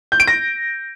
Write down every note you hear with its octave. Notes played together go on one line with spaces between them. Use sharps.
G6
D7
A#6